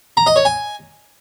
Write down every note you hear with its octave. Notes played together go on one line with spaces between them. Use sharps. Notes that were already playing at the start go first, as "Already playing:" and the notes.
A#5
D#5
C#5
G#5